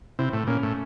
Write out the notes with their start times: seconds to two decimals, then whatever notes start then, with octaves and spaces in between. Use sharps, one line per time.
0.19 C3 E4
0.33 A2
0.47 A#2 C#4
0.63 A2